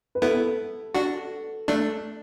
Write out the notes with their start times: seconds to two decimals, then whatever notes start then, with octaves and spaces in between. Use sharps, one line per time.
0.15 B4
0.22 B3 E4 A4
0.95 D4 F#4
1.68 A3 D4